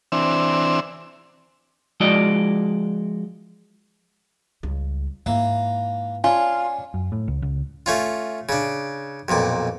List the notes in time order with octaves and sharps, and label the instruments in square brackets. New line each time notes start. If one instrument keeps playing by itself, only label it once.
[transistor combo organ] E3 C4 D4 E6
[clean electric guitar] F3 G#3 E4 F#4 D5 D#5
[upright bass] C#2 G3
[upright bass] G#2 [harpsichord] E3 A#3
[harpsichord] C#4 D4 [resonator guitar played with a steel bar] F4 [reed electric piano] G#5
[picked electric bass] F#2
A2
C#2
C#2
[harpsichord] A3 C#4 F4
C#3 D4
B1 F2 A#2 D6